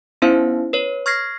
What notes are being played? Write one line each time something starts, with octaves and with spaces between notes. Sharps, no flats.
B3 C#4 D#4 E4 C5 F5
B4 C#5
C#6 F6 G#6 A#6 C7